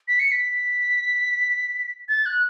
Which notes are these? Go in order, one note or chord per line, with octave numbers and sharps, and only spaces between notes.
B6
C#7
B6
A6
F#6